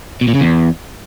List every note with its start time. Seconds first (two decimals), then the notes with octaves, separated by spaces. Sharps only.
0.21 B2
0.28 A#2
0.35 C#3
0.41 E2